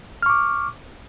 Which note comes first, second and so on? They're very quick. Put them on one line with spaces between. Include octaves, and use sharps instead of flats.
F6 C#6 D6